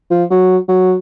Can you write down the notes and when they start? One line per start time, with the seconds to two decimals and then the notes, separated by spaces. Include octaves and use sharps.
0.11 F3
0.31 F#3
0.69 F#3